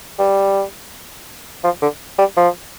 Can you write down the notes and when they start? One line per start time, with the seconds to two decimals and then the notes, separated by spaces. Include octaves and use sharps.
0.19 G3
1.64 F3
1.82 D3
2.18 G3
2.37 F3